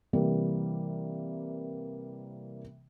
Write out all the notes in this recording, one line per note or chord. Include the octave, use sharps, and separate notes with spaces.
C3 E3 G3 A#3